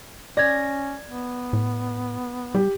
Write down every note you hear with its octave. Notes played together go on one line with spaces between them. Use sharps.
C#4 D5 G#6 A#6
B3
A2
G3 G4